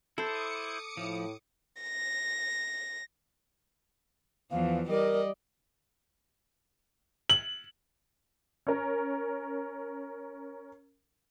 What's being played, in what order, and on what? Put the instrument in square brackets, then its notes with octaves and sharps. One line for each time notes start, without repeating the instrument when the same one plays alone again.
[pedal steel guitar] E4 C5 [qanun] A4 [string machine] D6 D#6 C#7
[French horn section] A2 [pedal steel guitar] F3
[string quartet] A#6
[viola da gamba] E2 E3 F3 [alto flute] F5
[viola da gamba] G3 D5 D#5 [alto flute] A#4
[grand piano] F#7
[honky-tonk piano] C#4 A#4